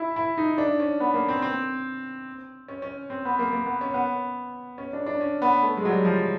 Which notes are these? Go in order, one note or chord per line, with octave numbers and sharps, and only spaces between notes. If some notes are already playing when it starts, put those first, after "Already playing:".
Already playing: E4
E4
D#4
D4
C#4
B3
A#3
C4
C4
C#4
C#4
C4
B3
A#3
A#3
B3
C#4
B3
C#4
D4
D4
C#4
B3
A3
G#3
F#3
G3
F3